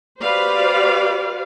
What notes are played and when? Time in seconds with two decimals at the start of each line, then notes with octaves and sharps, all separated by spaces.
0.22 F#4 G4 B4 C5 D5 F5